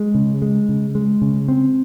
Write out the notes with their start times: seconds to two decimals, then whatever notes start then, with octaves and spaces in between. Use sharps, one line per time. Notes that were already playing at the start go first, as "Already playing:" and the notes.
Already playing: G#3
0.15 C#3
0.42 G#3
0.69 C#3
0.95 G#3
1.22 C#3
1.48 C4